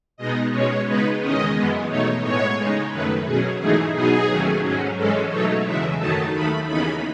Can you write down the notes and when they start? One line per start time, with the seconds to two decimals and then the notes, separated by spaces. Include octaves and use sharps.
0.17 B2 G#3 B3 D#4 D#5
0.51 B2 G#3 C#4 C#5
0.86 C#3 G#3 B3 D#4 B4
1.20 E2 D#3 G#3 C#4 D#5
1.54 F#2 E3 G#3 B3
1.88 B2 A3 D#4 C#5
2.22 A2 G#3 B3 C#5
2.57 C#3 G#3 D#4
2.91 F#2 D#3 A3 B4
3.24 B2 F#3 C#4 G#4
3.59 G#2 E3 A3 D#4 G#4
3.93 B2 F#3 B3 D#4 G#4
4.28 D#2 D#3 F#3 A3 C#4
4.62 G#2 F#3 C#4
4.96 G#2 E3 G#3 C#4 A4
5.30 B2 F#3 A3 D#4 C#5
5.65 E2 C#3 E3 G#3 E5
5.98 F#2 D#3 F#3 A3 D#4 A5
6.33 D#2 D#3 A3 B5
6.67 D#2 C#3 E3 B3 D#4 B5